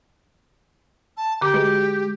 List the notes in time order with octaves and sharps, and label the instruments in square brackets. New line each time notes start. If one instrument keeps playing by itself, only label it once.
[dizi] A5
[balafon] D3 D6 [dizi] G4
[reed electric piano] G#3 [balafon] F#4 B4